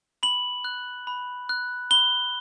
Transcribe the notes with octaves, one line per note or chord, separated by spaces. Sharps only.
B5 F#7
F#6
B5
F#6
B5 G7